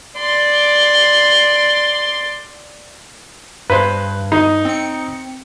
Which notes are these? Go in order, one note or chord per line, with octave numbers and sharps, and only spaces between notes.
D5 C6
G2 B4 C5
D#4
C4 C#7